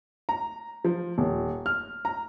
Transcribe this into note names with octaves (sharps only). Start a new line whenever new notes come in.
A#5
F3
D#1
F6
A#5